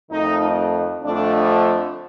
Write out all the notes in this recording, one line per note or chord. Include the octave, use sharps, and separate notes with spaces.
F2 D#3 A3 D#4
F2 D3 F3 A3 D4